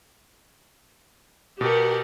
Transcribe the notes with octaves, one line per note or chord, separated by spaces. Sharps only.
B2 G4 A#4 F#5